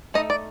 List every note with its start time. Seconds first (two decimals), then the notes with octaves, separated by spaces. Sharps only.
0.14 A3 D#4 D#5
0.30 D5